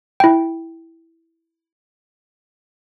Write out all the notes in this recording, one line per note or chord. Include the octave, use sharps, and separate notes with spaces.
E4 G5